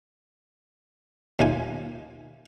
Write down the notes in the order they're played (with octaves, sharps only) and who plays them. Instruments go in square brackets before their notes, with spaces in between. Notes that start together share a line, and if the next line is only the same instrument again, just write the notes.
[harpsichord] D#2 A3 F4 G#5